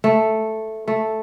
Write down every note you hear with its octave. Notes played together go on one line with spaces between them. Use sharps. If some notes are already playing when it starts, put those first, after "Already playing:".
A3
A3